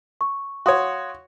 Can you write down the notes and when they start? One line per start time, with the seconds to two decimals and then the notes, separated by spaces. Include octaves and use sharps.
0.21 C#6
0.66 F#4 C#5 F5 C6 D#6